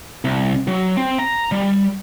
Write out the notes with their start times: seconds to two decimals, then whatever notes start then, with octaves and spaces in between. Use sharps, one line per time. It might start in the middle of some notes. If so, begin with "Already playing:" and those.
0.25 C2
0.68 F#3
0.97 C4
1.19 A#5
1.52 G3